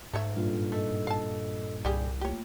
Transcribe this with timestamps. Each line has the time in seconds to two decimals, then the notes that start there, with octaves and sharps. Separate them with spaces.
0.13 G#2 A3 C#5 E5
0.36 G2 A#2 F4 A4
0.72 A3 A4 D#5 E6
1.07 F5 A5
1.85 C2 G3 G4 G#4
2.21 A3 A#3 F4 G4 C#5